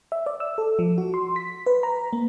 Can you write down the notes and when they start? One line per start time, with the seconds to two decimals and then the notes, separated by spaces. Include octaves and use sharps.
0.12 E5
0.26 D5
0.40 E6
0.58 A4
0.79 F3
0.98 F#4
1.14 C6
1.36 B6
1.66 B4
1.83 A#5
2.13 A#3